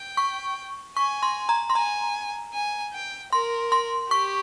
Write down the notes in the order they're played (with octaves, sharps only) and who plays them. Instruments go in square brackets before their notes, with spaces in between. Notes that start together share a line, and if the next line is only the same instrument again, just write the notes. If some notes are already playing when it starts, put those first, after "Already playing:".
Already playing: [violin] G5
[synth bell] C#6
[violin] G#5 [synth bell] C#6
[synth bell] C6
A#5
C6
[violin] G#5 [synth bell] A#5
[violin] G#5
G5
[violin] A#4 [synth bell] C6
[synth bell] C6
[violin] G4 [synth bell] C#6